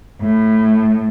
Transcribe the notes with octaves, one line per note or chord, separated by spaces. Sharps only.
A2